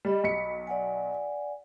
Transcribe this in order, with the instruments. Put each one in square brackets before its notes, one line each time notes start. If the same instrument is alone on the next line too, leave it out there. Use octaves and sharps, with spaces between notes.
[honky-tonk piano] G3 [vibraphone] D#5 B5
[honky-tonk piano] B1 B6 C#7
[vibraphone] D5 F#5 G#5